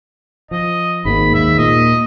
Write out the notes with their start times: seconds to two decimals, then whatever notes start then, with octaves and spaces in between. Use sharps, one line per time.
0.51 F3 D#5
1.05 G#1 G#2 B2 A#3 B5
1.34 D#2 E5
1.58 A#2 D#5